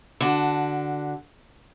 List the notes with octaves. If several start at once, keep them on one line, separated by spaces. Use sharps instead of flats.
D3 F#4 A5